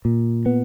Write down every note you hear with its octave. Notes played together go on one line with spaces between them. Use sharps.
A#2
B3